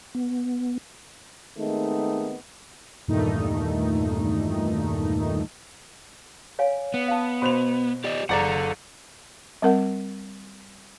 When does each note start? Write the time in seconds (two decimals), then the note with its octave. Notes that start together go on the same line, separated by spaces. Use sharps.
0.15 B3
1.58 D#3 G#3 A3 B3 C4 D#4
3.08 E2 G2 A#2 D#3 A3 D#4
6.59 C#5 F5 G#5
6.94 B3
7.08 F5 A5
7.42 B2 F#4 C5 B5 F7
8.04 G4 D5 D#5
8.29 F#1 A4 D5 F#5 A#5
9.62 G3 C4 A#4 F#5